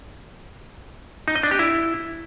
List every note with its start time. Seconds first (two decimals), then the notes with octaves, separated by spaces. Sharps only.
1.28 D#4
1.36 D#5
1.43 D4
1.51 G4
1.59 E4